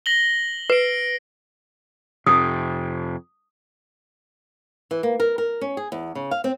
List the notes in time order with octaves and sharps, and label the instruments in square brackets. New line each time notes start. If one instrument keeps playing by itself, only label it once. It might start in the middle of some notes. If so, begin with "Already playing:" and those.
[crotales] A#6 F#7 G7
[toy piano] B4 [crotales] C7 D7
[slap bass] F2 C3 [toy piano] D#6
[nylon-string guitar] E3
A#3
A#4
A#4
C#4
G#4
E2
C#3
F5
C4